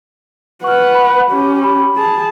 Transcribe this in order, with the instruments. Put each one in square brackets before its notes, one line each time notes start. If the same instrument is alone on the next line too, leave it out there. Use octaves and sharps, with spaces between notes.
[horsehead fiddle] B4 F#5 [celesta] C#6 F6
[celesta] B5
[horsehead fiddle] C#4 G4
[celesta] B5
[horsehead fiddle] G#4 A5